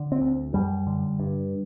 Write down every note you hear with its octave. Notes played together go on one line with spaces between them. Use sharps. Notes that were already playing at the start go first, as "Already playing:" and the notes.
Already playing: D3
C4
D2
F#2 G3
D3
G2